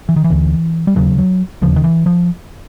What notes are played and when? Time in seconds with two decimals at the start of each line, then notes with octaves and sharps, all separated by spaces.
0.09 E3
0.16 D#3
0.24 E3
0.30 D2 D3
0.87 G3
0.96 E1 D#2 C#3 F#3
1.18 F#3
1.61 E1 D#2 C#3 F3
1.76 D#3
1.84 E3
2.06 F3